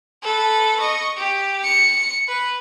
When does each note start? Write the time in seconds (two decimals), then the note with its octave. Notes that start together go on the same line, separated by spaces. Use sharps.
0.23 A4 B4
0.79 D#5 C#6
1.17 G4
1.64 C#7
2.28 B4